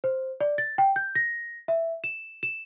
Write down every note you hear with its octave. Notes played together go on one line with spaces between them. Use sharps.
C5
D5
A6
G5
G6
A#6
E5
E7
E7